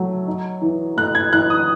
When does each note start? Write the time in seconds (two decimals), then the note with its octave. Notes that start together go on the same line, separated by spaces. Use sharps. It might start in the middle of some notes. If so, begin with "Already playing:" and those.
Already playing: F#3 A3
0.27 D#4
0.62 E3
0.97 A3 F#6
1.15 G#6
1.33 E3 F#6
1.50 D#6